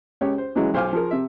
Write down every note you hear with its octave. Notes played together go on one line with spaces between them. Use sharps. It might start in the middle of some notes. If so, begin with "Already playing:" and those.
C#2 G4 C#5
C5
C#3 E3 F#3 G#3
B1 C5 F5 G#5 D6 F6
F3 G#4 A#4
C3 E5